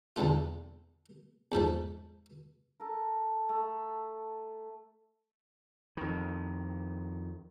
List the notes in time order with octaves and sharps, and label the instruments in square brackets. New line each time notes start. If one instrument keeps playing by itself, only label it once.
[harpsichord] B1 E2 D3 A3 F4
E2 G#2 F3 A3
[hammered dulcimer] A4 A#4
A3
[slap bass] F2 D#3